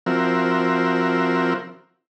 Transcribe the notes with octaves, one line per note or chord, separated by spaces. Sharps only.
F3 C4 F#4 A#4 E5